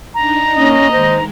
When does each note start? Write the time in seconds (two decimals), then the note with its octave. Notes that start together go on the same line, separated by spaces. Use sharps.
0.14 D4 D#4 A#5
0.56 A#3 C#4 D#5
0.91 D#3 G#3 C5